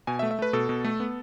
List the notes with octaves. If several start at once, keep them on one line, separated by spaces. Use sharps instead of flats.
B2 G#5
E5
A3
E5
A3 B4
B2 A4
B2
A3
B3